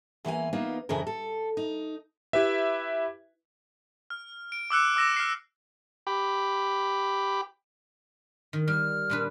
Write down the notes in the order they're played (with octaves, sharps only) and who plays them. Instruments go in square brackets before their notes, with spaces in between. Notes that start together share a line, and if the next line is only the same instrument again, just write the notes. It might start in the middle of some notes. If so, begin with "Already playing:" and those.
[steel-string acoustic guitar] E2 E3 A#3 G#5
A#3 B3 D#4 F4
F2 C#3 E3 G#4 A#4
A4
D#4
[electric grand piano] E4 G4 B4 E5
[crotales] F6
D7
D6 E6 F#6 C#7
D6 E6 A#6 E7
F6 C7
[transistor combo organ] G4 B5
[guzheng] D#3
[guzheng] G3 [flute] F6
[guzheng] A#2 D4 B4